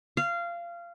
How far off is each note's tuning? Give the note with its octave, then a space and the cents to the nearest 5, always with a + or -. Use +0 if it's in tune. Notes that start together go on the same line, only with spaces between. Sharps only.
F5 -20